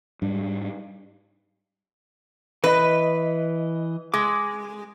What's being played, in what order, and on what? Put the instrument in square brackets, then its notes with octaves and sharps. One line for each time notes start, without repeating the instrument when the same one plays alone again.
[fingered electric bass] G#2 G3 D4
[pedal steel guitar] E3 D#5 [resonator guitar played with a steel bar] B4
[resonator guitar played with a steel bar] G#3 [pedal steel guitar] D6